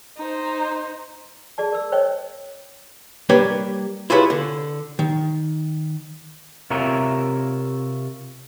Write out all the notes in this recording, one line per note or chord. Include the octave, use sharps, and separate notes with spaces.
D#4 C5
G#4 D5 A5
A#4 E6
C5 C#5 D#5 G5
G3 A#3 D4 G4 B4 C#5
E4 F4 G4 G#4 B4 C#5
D3
D#3
C3 F4 A#4 C#5 E5 A#5